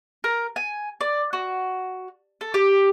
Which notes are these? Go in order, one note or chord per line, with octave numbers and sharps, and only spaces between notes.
A#4
G#5
D5
F#4
A4
G4